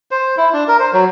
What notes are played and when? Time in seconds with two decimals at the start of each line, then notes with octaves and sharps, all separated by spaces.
0.11 C5
0.37 E4
0.53 D4
0.68 A#4
0.80 C5
0.93 F#3